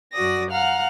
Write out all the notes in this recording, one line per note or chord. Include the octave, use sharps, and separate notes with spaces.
F#2 F#4 D5 D#6 A#6
F5 F#5 A#5 F6